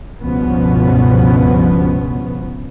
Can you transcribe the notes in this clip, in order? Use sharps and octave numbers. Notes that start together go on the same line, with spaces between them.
C#2 G2 B2 F3 B3 C#4